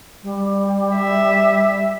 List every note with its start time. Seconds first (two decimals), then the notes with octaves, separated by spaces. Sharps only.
0.23 G3
0.96 E5